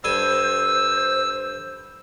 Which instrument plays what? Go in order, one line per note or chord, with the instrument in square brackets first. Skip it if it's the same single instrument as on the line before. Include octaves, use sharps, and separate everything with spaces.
[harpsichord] G2 A4 G#5 [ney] C5 [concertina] E6